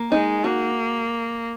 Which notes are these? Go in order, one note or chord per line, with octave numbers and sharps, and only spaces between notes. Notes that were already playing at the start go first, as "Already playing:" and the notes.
Already playing: A#3
G#3 D#4
A#3 F#4